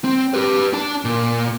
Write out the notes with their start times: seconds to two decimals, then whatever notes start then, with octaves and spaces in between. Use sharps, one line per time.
0.04 C4
0.34 G4 B4
0.73 D4 A5
1.05 A#2